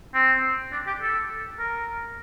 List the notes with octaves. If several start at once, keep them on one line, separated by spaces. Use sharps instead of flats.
C4
D4
G4
A4
A#4